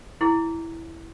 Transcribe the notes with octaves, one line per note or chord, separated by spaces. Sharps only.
E4 G#4